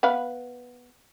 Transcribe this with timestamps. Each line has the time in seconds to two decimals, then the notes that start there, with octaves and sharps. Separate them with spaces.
0.03 B3 B4 F5